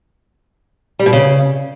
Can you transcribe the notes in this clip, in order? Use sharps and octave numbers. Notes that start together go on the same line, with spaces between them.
G3
B2
C#3